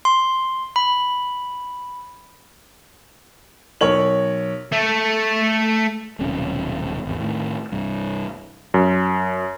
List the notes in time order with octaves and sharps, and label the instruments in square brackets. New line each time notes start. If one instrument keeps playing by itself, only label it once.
[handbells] C6
B5
[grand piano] B1 A#4 C#5 F#7
[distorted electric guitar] A3 A4
[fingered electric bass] D#1 B1 C3 C#4
G#1 E2
A2 D#3
C2 G2
[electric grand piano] F#2